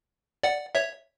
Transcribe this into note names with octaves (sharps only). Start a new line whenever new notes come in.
D5 F#5
C#5 E5